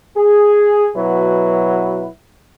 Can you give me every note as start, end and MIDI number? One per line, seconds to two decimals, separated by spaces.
0.17 0.89 68
0.96 2.06 47
0.96 2.06 54
0.96 2.06 64
0.96 2.06 66
0.96 2.06 71